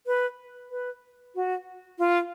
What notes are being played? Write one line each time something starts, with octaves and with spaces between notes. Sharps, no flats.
B4
B4
F#4
F4